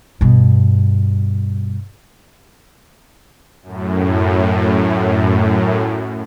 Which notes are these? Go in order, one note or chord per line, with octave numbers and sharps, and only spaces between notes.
G2 B2
F#2 A2